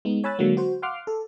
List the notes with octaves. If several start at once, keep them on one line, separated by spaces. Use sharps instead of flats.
G#3 B3 D#4
C#5 G#5 B5 E6 F#6 A6
D3 F#3 G#3 A#3
F#4 C5
F5 F#5 C6 D6 F6
A4